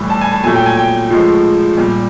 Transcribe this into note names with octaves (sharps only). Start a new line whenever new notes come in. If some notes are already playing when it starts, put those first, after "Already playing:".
Already playing: A2 E3 G3
A5
G#5
A5
A#2 F#3 A3 G#5
G5
G#5
G5
A2 F3 G#3
A#2 G3